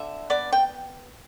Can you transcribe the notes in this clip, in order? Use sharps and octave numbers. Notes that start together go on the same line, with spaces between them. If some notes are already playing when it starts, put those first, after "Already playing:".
Already playing: D3 E5
B3 D5
G5